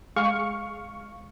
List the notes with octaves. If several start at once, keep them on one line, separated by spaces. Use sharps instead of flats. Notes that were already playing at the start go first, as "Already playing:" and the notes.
G#3 F5 C#6